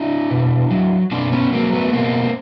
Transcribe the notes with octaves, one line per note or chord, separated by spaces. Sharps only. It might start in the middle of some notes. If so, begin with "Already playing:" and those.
Already playing: D4 E4
B2
F#3
B2 C4 D4
B3 C#4
F#3 A#3 C4
A3 B3
B2 A#3 C4